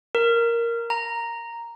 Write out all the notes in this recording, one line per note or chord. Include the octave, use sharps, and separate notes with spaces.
A#4
A#5